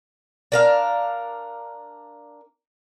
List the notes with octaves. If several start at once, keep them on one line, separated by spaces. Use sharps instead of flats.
D4 A#4 F5